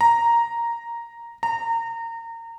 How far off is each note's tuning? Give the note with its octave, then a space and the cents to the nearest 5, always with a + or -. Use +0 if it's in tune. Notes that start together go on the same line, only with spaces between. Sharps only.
A#5 +0
A#5 -25